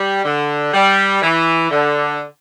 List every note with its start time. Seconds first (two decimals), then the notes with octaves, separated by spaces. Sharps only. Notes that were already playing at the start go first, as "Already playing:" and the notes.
Already playing: G3
0.24 D3
0.73 G3
1.22 E3
1.70 D3